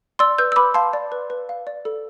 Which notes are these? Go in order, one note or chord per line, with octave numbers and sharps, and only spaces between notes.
D5 C6 E6
B4 E6 G6
E6
B4 B5 D6
F5 A5 C6
D5
B4
B4
F5
D5
A4